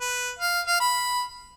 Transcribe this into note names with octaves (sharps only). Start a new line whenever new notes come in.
B4
F5
F5
B5